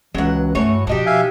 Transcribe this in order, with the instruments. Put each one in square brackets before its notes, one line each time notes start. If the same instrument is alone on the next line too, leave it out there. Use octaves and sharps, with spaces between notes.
[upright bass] C#2 [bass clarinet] E3 [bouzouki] F#3 F#5
[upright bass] G2 [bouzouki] E3 F#4 C#5 [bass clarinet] A3
[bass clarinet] B2 [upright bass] E3 F3 [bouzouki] D4 D#4 G4
[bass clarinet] B2 [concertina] E5 F5 G#5